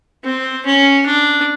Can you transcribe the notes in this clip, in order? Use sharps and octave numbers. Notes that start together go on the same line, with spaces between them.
C4
C#4
D4